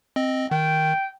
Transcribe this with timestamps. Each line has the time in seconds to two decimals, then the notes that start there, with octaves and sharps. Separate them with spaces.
0.16 C4 D#5
0.51 D#3 G5